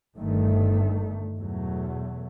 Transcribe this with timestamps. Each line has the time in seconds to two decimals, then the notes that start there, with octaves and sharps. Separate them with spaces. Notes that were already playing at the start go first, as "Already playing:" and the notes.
0.17 G1 G2 D#3 A3
1.36 E2 B2 F#3 A3